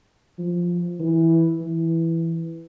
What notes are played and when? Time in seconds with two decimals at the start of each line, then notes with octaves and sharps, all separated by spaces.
0.39 F3
1.00 E3
1.61 E3